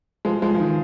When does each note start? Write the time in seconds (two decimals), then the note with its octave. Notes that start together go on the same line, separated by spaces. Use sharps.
0.25 F3 G#3
0.42 F3 G#3
0.55 F3
0.60 D#3